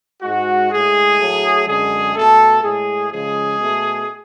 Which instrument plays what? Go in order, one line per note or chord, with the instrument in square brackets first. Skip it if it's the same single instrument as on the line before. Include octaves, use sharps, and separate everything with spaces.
[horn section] G#2 G#3 F#4
A2 G#3 G#4
A2 F#3 A3
F#2 D3 G#3 G#4
B2 A3 A4
A2 G#3 G#4
C#3 F3 G#3 G#4
B2 A3